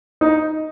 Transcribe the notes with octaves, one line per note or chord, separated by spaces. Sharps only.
D#4